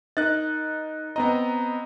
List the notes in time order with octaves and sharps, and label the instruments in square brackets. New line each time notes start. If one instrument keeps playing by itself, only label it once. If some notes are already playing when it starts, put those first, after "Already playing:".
[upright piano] D#4 [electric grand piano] A#4 F#6 A6
[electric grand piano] B3 C4 D#5 [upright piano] A#5